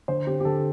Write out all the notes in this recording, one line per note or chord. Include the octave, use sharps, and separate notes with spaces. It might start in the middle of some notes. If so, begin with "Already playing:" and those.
D3 C5
C4 G4
G4
D3 A4